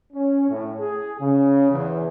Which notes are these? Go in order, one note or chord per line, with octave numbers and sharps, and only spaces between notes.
C#4
A2
G#4
C#3
E2